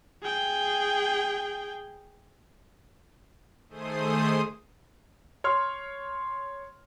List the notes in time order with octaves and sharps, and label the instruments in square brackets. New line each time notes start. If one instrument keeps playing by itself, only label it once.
[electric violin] G#4 G5
[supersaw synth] D#3 A3 G#4 C5 D#6
[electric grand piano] C#5 C6 F6